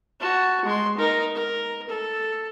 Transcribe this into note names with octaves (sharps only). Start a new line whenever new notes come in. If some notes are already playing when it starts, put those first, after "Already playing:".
F#4 A5
G#3 C6
D#4 A#4
A#4
A4